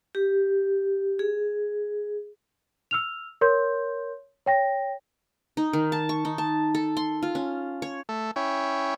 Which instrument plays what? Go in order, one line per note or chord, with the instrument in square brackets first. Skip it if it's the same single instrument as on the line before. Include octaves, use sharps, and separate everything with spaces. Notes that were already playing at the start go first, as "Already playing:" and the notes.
[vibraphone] G4
G#4
[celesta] E6 F6 F7
A#4 C#5 C6 G6
C#5 G5 A#6
[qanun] D#4
D#3
A5
C#6
D#4
A5
A4
C6
F4
C#4
C#5
[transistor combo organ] A3 A4
C#4 E4 C#5 G5